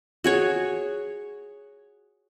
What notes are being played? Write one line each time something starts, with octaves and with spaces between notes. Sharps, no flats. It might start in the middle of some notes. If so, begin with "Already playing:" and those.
F#4 G#4 C#5